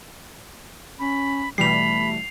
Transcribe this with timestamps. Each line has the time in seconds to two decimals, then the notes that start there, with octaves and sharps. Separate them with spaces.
0.99 C#4 B5
1.58 B2 E3 G3 A3 B5 C7 F7